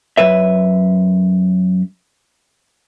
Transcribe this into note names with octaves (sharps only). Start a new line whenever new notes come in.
F#2 B4 E5